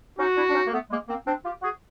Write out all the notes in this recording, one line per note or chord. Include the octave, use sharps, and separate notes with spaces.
C#4 D#4 F#4
D4 E4
D4
C#4 D#4
A#3
A3 B3
G#3 A#3
A#3 C4
C4 D4
F4 G4
F#4 G#4